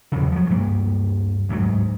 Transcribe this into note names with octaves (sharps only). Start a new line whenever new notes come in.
E2 C#3
F3 F#3
D2 G2 G3 A#3
D2 G#2 F#3